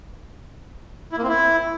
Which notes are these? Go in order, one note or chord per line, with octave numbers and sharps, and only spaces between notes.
E4
A#3
C4
E4